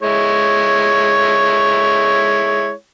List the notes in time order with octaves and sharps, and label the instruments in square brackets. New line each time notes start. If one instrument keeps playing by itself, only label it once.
[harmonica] G#3 E4 C#5